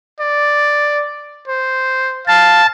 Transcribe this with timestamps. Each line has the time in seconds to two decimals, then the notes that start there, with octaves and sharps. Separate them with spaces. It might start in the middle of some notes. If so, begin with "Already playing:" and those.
0.20 D5
1.48 C5
2.28 F5 A5